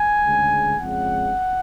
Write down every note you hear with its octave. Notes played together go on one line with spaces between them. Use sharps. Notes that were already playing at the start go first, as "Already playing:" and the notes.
Already playing: G#5
D2 C#3 G#3
F2 C#3 G#3 F#5